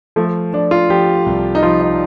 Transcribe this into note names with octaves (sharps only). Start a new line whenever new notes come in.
F3 A3
F3 D4
F4
F3 G4
C2
D#4
F3 F4
D#4